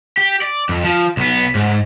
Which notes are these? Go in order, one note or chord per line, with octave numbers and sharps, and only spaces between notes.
G4
D5
F2
F3
B1 B3
G#2